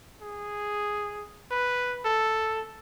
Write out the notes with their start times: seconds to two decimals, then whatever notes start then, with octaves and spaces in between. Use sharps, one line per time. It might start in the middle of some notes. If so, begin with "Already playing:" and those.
0.22 G#4
1.51 B4
2.05 A4